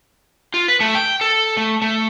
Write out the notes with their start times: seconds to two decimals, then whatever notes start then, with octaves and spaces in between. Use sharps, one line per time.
0.54 F4
0.68 B4
0.80 A3
0.95 G5
1.21 A4
1.57 A3
1.82 A3